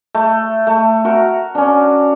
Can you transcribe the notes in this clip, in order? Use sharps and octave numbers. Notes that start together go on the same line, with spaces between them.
A3
A3
F#4 A#4 A#5
C#4 D4